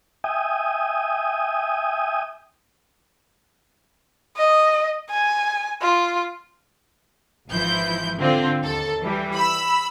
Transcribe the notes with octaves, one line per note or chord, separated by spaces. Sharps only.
E5 G5 G#5 D#6
D#5
G#5
F4
G#1 E3 F3 E4 G6
D3 C4 F4
D#2 A4
E3 G3
B5 E6